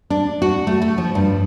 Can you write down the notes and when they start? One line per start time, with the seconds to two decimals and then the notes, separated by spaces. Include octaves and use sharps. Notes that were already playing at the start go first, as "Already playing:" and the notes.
0.10 D4
0.42 F#4
0.67 A3
0.82 A3
0.98 F3
1.15 G2